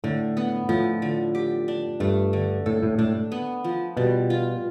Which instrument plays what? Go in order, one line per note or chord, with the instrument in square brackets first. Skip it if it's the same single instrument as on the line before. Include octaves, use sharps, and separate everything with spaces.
[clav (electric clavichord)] A2 [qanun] D3
[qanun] B3
[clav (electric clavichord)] A2 [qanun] F3
[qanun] D3
G4
D4
[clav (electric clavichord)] G2 [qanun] A3
[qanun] D3
[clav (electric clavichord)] A2 [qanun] A4
[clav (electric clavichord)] A2
[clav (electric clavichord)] A2 [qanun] D4
[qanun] B3
F3
[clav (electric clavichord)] B2 [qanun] G3
[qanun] F4